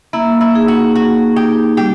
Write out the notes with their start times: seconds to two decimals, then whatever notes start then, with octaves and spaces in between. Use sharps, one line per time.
0.13 A#3 E4
0.41 E4
0.55 D#4 G#4
0.68 F#4
0.95 A#3 F#4
1.36 D#4 G4 G#4
1.77 G3 G4